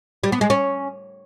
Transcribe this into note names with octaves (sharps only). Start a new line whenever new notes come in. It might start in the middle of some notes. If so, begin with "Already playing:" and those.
G3
B3
G#3
C#4